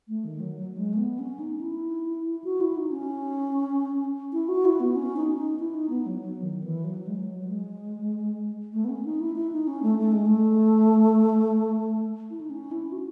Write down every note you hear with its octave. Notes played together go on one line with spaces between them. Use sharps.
A3
D#3
F#3
F#3
G#3
A3
B3
C#4
D#4
E4
F#4
E4
D#4
C#4
E4
F#4
E4
B3
C#4
D#4
D#4
E4
D#4
B3
F#3
F#3
D#3
E3
F#3
G#3
F#3
F#3
G#3
A3
B3
C#4
D#4
E4
E4
D#4
C#4
A3
A3
G#3
A3
E4
D#4
C#4
E4
F#4